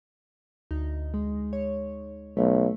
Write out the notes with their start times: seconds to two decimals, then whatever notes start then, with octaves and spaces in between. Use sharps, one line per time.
0.71 D2 D#4
1.14 G#3
1.53 C#5
2.37 B1 A3